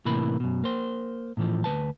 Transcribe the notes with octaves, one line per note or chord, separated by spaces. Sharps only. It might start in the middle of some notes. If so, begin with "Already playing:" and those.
A2 C3 E3 A#3 B5
F#2 B2
A#3 C5
A2 E3 F3
D2 F3 B4 A5